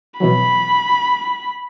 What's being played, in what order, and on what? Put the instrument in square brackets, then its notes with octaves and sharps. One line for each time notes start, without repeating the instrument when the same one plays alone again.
[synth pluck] B2 E3 F#3 [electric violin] B5